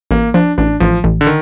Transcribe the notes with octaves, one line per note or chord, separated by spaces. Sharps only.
A1 A#3
F3 D4
A1 D4
A1 F3
A1
D3
D#3